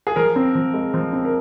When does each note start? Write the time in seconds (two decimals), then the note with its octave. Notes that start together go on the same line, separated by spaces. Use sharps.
0.07 G#4
0.16 F3 A#4
0.36 C4
0.55 F3
0.74 G#3
0.94 F3
1.13 C4
1.25 A#4